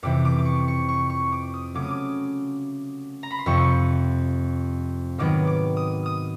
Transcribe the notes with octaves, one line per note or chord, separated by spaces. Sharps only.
F2 C3 E3 D6
D6
D6
C#6
C#6
C#6
C#6
D6
D#6
C#3 F#3 A3 D6
D#6
D6
A#5
B5
C6
F2 C3 F3 C#6
G#2 D#3 F#3 B3 D6
D6
D#6
D#6